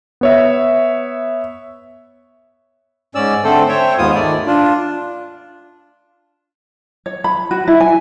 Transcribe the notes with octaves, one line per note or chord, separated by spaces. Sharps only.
B3 C#5 E5
G#2 C#4 D5 E6
D3 A3 C4 A4 C5
C5 C#5 E5 G5
D#2 G#2 B3 F4 D#6
D#3 A3 D5
D4 F4
C#5
B5
F#4
E4
G#5